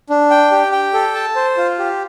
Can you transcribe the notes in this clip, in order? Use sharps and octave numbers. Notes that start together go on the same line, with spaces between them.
D4
G5
G4
G5
A4
A5
C5
F4
G4